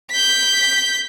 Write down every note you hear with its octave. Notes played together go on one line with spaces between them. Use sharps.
G6 B6